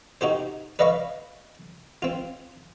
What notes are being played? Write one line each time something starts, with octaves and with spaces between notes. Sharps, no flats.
D#4 F#4 G4 C5
B4 D5 D#5 F5 B5 C#6
C4 F4